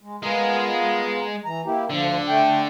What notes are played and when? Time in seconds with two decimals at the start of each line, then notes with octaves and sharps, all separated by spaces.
0.01 G#3
0.23 G#3 B3 F4 G#4 A#4
1.45 E3 A#5
1.66 A#3 E4 G4
1.90 D2 D3 F3
2.28 A3 G5